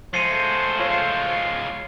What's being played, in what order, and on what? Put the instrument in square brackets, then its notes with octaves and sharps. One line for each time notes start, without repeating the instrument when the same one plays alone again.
[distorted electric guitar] F3 G#3 [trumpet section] A3 C5 [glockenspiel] C7 C#7 D#7
[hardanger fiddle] F4 C#5 [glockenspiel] F#7